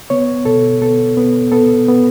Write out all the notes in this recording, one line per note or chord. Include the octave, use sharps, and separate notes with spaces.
B3 C#5
B2 A4
B3 A4
B3
B3 A4
B3